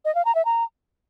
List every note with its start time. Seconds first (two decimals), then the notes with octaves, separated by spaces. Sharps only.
0.05 D#5
0.15 F5
0.25 A#5
0.35 E5
0.45 A#5